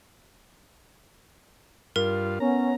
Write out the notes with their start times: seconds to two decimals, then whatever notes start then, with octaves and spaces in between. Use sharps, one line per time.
1.96 G2 F4 A#4
2.40 B3 C#4 A#5